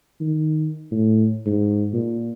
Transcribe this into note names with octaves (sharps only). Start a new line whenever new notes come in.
D#3
A2
G#2
A#2